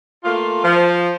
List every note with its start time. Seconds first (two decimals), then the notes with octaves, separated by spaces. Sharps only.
0.24 A3 A#3 F4
0.64 F3